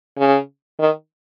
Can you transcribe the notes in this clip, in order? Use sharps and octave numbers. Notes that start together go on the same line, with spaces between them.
C#3
D#3